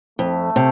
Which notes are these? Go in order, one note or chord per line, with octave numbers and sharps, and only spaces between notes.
F2 A3
C3